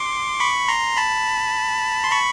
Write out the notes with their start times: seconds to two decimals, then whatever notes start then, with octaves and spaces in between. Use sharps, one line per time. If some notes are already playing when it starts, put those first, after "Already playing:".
Already playing: C6 D6
0.40 B5 C#6
0.68 A#5 C6
0.97 A5 B5
2.04 C6
2.11 B5 C#6